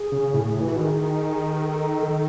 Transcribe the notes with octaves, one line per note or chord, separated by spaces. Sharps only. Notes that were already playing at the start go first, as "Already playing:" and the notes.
Already playing: G#4
C#3
A2
A2
E4
E3 F#4
D#3 G#4
B4
A4
D#3